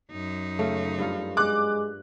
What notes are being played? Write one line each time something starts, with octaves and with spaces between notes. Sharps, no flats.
F#2 D#4
C#3 A3
G2 F4
G#3 D6 F#6